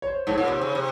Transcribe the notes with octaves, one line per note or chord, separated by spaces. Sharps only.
C#5
C5
G#2 C#5
A#2
C3 C5
C#3
C3